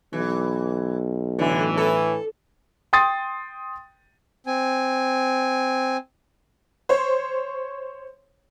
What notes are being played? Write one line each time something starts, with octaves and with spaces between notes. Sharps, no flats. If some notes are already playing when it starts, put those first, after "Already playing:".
B1 E3
A2 D3 E3
A4
G5 C6 D#6 A6
C4 G#5
C5 C#5